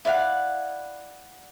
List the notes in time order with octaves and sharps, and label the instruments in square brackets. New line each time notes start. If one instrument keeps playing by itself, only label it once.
[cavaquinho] E4 D5 F5 F#5